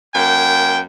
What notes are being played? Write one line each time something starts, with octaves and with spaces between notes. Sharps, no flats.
F#2 A#3 G5